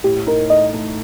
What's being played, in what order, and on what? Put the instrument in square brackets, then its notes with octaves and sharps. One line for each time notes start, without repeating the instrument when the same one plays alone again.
[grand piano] A2 [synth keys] G4
[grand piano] D#4 [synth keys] A#4
[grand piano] A3 [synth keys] D#5
[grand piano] A3